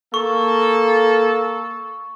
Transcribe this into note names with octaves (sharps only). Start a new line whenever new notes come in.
A#3 A4 C#6